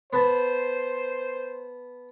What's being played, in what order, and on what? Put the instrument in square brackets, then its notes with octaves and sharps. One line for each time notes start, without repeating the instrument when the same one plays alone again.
[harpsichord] B3 B4 A5 [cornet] C5